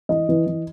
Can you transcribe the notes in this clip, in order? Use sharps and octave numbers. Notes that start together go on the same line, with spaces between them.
E3 D#5
E3
E3